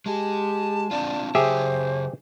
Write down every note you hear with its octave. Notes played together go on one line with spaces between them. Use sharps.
G#3 G4 G#4 A5
C4 D4 F4 D5
C#3 F#3 G4 G#4 C5 C#5 E5